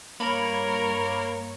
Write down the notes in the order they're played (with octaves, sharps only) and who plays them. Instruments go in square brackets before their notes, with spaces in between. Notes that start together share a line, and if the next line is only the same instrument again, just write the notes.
[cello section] G2 C#5 [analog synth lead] A#3 [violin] A#4 [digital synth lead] B5